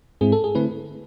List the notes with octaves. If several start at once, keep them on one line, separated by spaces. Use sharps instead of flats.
G#2 G#3 C4 E4 G#4
A4
G#4
D3 A3 C4 E4 B4